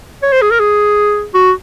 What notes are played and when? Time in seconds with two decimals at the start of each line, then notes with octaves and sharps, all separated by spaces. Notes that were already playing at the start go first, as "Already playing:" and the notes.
0.22 C#5
0.32 C5
0.42 G#4
0.51 A#4
0.59 G#4
1.34 F#4